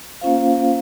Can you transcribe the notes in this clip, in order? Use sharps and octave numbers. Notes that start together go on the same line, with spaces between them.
A#3 C#4 F4 C5 F5